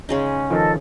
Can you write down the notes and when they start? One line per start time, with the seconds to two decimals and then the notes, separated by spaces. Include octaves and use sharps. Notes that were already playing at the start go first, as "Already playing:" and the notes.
0.09 C#3 G#3 C#4 D#4
0.50 D#3 F3 A4 D#5